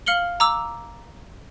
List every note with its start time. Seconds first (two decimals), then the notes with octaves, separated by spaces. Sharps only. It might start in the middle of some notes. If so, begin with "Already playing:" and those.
0.06 F5 F6 C#7 F#7 G7
0.40 A#5 D6 E6